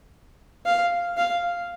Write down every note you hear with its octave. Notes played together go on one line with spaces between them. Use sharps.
F5
F5